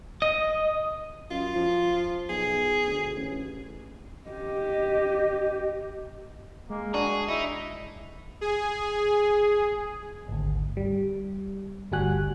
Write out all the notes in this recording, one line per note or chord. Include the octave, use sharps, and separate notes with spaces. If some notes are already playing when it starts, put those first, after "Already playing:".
D#5
F#2 F4
F3
B1 G#4
D2
A1
G4 D#5
G#3 A#3
D4 F#4 G#4
D#4 E4
G#4
G#1 D2
G3
G1 D2 G3 F#4 G#5 F#6